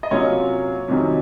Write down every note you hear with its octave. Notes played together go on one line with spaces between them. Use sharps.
D#5
C3 F#3 A#3 C#4 F4 C#5
F2 C3 D#3 F#3 C#4